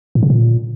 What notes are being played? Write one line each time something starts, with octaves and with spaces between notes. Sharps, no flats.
A2
C#3
A#2